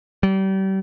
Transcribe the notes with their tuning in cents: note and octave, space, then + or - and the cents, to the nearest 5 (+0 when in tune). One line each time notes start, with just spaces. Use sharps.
G3 -35